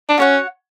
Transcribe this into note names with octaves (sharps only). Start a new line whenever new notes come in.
D4
C#4 F#4 C#5 F#5